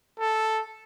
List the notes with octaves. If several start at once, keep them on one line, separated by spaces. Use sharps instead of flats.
A4